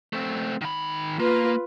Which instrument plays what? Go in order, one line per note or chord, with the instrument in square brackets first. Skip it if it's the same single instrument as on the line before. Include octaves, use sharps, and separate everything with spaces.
[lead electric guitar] A3 C4
D#3 B5
[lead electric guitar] A#3 [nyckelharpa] F4 B4